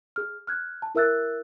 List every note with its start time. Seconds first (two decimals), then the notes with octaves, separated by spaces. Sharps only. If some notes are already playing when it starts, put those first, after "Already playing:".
0.16 G#4 F6
0.47 F6 F#6 G#6
0.82 A5
0.95 E4 A#4 E5 E6 F#6 A6